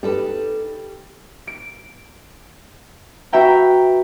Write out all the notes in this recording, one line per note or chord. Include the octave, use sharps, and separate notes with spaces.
G3 D#4 A4 B4
D7
F#4 B4 E5 G5 A#5